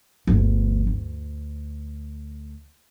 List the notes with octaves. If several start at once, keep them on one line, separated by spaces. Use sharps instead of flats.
G1 D2
D2